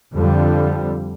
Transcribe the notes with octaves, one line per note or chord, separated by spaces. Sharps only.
F2 D3 G3